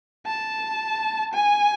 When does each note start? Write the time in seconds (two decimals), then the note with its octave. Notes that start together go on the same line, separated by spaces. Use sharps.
0.26 A5
1.34 G#5